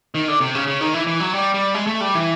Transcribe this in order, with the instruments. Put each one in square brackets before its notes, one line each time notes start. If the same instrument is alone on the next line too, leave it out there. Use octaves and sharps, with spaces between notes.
[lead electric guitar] D#3
D3
C3
C#3
C#3
D#3
E3
E3
F#3
G3
G3
G#3
A3
G3
E3